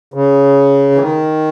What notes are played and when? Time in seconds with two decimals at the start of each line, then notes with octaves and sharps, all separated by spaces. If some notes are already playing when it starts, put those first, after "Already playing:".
0.14 C#3
0.95 E3
1.00 D#3